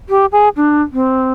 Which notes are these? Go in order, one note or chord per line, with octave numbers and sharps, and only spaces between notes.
G4
G#4
D4
C4